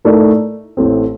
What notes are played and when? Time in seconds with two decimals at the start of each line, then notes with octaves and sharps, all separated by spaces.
0.05 A2 A3 D#4 A#4 D5
0.77 A1 A2 A3 C4